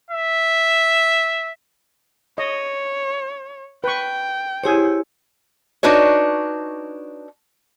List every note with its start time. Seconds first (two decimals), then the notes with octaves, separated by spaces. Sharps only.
0.11 E5
2.38 C#5 D#5
3.84 B4 G5 C#6
4.64 E4 G4 G#4 C5 C#5
5.83 D4 D#4 F#4 B4 C#5